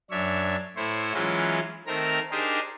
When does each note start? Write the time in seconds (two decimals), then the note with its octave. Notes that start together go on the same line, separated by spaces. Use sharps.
0.11 F#2 D4 C#5 E5
0.76 A2 E4 C5 C#5
1.14 E3 F#3 G#3 C#4 E4 F4
1.87 D#3 A3 C4 A#4 A#5
2.31 D4 D#4 G4 G#4 A#4 C5